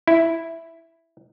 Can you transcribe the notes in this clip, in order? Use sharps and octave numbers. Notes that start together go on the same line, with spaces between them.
E4